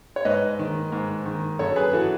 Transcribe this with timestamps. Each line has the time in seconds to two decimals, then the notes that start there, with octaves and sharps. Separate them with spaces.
0.16 C#5
0.25 G#2 B4 D#5
0.59 D#3
0.92 G#2
1.25 D#3
1.59 F#2 A4 C#5
1.76 G#4 B4
1.93 E3 F#4 A4